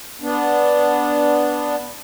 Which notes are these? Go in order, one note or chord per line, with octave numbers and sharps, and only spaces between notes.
B3 D4